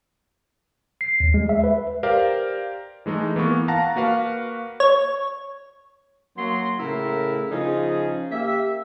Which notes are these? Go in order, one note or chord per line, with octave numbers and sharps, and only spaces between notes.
C7
D#2
G#3
E5
B4
G4 A#4 C5 D5 F5
E3 G#3 A3 D#4
E3 A#3 B3 C#6
F5 F#5 A5 A#5 A#6
A#3 F#4 B4 F5
C#5
F#3 A#3 F#4 C6
A2 C#3 E4 A#4
C#3 F3 D#4 G#4
A#3 G4 E5